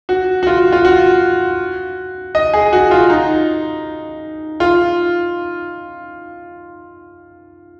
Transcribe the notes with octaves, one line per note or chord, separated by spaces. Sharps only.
F#4
F#4
F4
F4
F#4
D#5
G#4
F#4
F4
D#4
F4